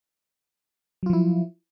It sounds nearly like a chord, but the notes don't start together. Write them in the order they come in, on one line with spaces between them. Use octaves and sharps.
F#3 F4 F3 E4